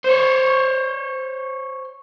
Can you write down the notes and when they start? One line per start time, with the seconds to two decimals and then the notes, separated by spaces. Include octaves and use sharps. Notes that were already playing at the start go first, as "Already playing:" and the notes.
0.04 C5 C#5